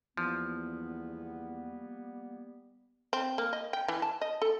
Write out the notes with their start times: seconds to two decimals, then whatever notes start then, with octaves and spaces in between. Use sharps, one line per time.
0.17 E2 F3 G3 A#3 B3
3.13 C4
3.38 A#3
3.53 D#5
3.73 G5
3.88 E3
4.02 A5
4.21 D#5
4.42 A4